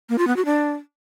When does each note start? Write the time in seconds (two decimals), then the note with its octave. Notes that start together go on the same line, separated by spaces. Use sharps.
0.09 A#3
0.18 F4
0.27 B3
0.36 F#4
0.45 D4